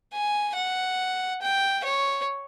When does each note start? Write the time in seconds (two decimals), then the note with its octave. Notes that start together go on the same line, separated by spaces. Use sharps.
0.13 G#5
0.55 F#5
1.42 G5
1.84 C#5